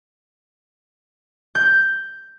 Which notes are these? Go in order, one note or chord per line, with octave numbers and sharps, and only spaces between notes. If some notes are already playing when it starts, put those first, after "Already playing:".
G6